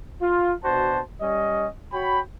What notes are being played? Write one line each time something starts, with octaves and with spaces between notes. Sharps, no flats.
F4
B2 D4 F#4 C5 A5
G3 C#4 D#5
F#4 C#5 G5 B5